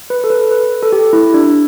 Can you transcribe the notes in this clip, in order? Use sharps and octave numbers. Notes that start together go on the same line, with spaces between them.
B4
A4
B4
B4
A4
G4
E4
D4